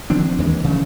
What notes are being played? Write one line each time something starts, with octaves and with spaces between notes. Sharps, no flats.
D#3 F3 C4 D4
D#2 E3 G#3
C2 C#3 F3 A3